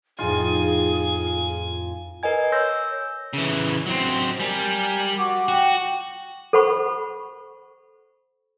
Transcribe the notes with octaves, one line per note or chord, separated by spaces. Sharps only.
F2 A2 D#4 F4 G#4 G#5
A#4 B4 D#5 G#5 G#6
C#5 C6 E6 G6 A#6
C#3 E3
F#3 C4
G3 A#4 G#5
F#4 D6
F#4 G5
A4 C5 F#5 B5 C#6